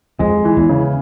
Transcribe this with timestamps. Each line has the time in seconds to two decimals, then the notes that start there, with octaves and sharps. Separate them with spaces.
0.19 F2 G#3
0.45 E3
0.57 E2
0.69 C#3